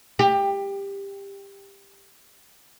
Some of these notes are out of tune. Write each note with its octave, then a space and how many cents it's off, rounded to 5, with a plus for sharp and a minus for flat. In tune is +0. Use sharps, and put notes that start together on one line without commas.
G4 +15